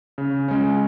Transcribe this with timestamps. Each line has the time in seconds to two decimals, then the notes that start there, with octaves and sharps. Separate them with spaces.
0.18 C#3
0.48 G#3 C#4